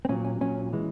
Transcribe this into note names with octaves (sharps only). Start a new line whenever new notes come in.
C4
A#2 F#3 C#4
C#4
A#2 F#3 C#4
E3 G#3